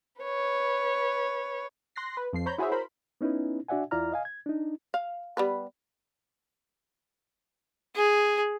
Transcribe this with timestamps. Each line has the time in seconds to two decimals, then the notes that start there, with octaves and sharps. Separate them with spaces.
0.21 B4 C#5
1.96 C6 F#6 A#6 C7
2.17 B4
2.33 F2 F3 C7
2.46 C5 C#5 A#5 B5 G6
2.58 E4 F#4 G#4 C5 C#5 E5
2.72 A#4 C5 B5
3.21 B3 C#4 D#4 E4 B4
3.68 D4 F#4 D5 E5 F#5 G#5
3.91 E2 E4 F4 D5 A#5 F6
4.12 D#5 F5 G#5
4.25 G#6
4.46 D4 D#4
4.94 F5
5.37 G3 B3 B4
7.95 G#4